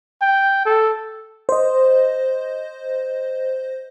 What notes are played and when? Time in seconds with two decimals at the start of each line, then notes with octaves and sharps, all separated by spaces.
0.22 G5
0.66 A4
1.49 C5 D#5